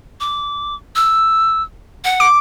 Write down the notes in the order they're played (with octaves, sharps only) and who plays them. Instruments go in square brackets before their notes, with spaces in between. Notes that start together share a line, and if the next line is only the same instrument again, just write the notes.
[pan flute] D6
E6
F#5
[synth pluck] D6